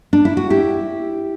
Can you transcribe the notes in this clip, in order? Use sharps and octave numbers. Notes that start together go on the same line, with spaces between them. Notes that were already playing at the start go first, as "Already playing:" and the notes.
D4
E4
F#4
E4 G4